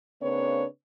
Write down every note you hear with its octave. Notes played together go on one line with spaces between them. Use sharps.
C#3 A#3 C4 D4 B4 C#5